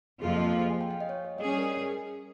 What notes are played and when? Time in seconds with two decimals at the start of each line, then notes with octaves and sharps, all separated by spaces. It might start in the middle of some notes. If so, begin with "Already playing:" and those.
0.22 F2 C3 F3 A#3 F4 G#4
0.37 D#5
0.70 G#5
0.81 G5
0.91 F5
1.00 D#5
1.09 C#5
1.25 C#5
1.38 G3 C#4 G#4 D#5
1.48 C#5
1.58 A#4